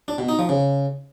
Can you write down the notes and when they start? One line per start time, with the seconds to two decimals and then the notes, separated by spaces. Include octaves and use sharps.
0.08 D4
0.18 B2
0.29 D#4
0.39 F3
0.49 C#3